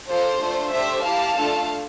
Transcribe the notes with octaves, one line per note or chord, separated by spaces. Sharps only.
A#3 F4 A4 C5
A3 D4 F4
A3 D4 G4 C5 E5
A#3 E4 G4 F5 A5
A3 D4 F4 A4